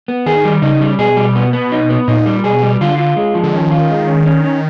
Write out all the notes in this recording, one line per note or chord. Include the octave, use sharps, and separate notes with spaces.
B3
D#3 G#4
G3
C#3 D#4
G3
B2 G#4
G3
B3
B3
D#4
B3
A#2 D#4
G3
B2 G#4
G3
D3 F4
F4
G#3
F3
D3
D#3 C#4
F4
G#3
C#4
C#4
C#4